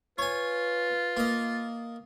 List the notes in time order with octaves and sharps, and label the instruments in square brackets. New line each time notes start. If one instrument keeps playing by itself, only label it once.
[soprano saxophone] F4 [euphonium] B4 [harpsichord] C#5 G#5
[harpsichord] A#3 D#5